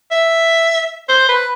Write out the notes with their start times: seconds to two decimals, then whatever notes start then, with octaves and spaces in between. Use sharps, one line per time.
0.11 E5
1.09 C5
1.29 B4